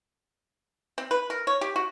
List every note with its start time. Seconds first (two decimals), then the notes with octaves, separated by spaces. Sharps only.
0.98 C4
1.11 B4
1.30 A#4
1.47 C#5
1.61 G4
1.76 F#4